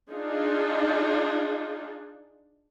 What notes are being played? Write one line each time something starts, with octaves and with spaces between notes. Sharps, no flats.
D4 D#4 F4 G#4